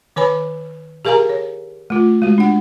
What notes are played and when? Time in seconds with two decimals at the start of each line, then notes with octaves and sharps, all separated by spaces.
0.16 D#3 B4 C#5 G#5 B5
1.05 G4 G#4 A#4 F5 G#5 A#5
1.29 C#5
1.90 A3 F4
2.22 G#3 F#4
2.38 D4 F#5